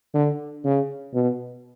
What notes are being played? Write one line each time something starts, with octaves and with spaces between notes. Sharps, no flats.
D3
C#3
B2